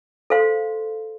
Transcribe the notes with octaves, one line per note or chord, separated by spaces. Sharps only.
A4 C5 F5 C6